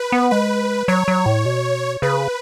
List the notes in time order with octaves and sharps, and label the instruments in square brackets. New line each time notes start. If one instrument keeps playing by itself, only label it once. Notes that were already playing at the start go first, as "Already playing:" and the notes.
Already playing: [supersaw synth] B4
[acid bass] B3
[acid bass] G#3 [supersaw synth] B4
[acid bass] F#3 [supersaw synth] C#5
[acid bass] F#3
A2
B2
[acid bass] C#3 [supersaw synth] B4